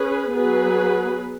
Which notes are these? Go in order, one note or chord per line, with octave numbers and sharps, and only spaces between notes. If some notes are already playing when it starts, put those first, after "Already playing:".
Already playing: C#4 G#4 B4
F#3 B3 G#4 B4